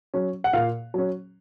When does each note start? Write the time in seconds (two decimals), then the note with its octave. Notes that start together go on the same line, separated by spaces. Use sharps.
0.14 F#3 C#4
0.44 F#5
0.53 A#2 F5
0.94 F#3 C#4